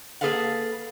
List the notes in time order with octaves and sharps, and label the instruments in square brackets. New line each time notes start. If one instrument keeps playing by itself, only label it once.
[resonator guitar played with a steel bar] A#3 G#4 A4 B4 F5 F#5